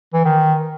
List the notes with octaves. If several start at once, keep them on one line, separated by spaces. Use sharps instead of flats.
E3
D#3